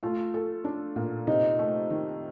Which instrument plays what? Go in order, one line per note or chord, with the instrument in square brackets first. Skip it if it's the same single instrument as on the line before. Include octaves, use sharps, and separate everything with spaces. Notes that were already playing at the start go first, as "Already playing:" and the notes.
[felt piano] A3 [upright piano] F4
[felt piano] A4
D4
A#2
[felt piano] C3 [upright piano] D#4
[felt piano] A3
D#3